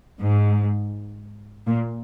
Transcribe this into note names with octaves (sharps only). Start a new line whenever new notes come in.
G#2
A#2